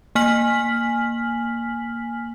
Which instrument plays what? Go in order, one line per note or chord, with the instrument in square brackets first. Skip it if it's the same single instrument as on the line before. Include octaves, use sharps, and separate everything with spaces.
[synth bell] A#3 G#5 F6 B6 F#7